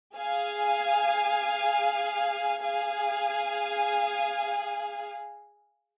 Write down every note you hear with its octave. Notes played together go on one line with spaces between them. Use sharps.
G#4 F5 G#5
G#4 F5 G#5